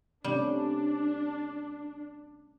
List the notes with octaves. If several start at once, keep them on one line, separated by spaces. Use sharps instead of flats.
C3 G3 A3 C#4 D4